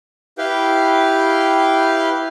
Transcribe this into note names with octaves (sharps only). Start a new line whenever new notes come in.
E4 G4 B4 F5 G5